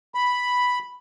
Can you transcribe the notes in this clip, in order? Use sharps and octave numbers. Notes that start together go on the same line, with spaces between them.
B5